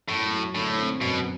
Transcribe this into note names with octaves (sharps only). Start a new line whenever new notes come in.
F#2 A2
F#3
A2 D3
C4
F#2 B2